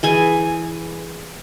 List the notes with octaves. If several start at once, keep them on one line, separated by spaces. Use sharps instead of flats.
E3 G#4 G#5